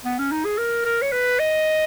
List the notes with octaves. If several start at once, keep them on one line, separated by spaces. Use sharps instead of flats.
B3
C#4
D#4
G#4
A#4
A#4
C#5
B4
D#5